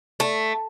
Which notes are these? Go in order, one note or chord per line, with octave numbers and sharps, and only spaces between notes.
A3